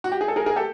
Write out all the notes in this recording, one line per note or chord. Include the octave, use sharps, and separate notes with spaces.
F#4
G4
G#4
A4
G#4 A#4
G#4 A#4
G4 A4